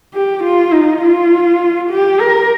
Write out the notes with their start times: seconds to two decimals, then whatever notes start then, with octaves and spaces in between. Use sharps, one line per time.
0.14 G4
0.44 F4
0.73 D#4
1.02 F4
1.90 G4
2.20 A#4